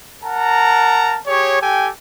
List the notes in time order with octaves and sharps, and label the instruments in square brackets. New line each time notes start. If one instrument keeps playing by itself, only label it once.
[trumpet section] A#4 F#5 A5 A#5
G4 G#4 C#5
G4 A4 G5 G#5